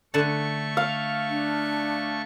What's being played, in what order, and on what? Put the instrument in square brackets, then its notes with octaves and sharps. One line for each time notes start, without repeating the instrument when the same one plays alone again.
[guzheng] D3 F#5 A5 [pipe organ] A3 C#6
[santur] F5
[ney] D4